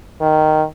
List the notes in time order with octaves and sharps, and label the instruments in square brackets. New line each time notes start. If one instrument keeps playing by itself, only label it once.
[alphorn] D#3